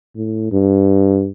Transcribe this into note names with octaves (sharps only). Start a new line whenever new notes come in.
A2
G2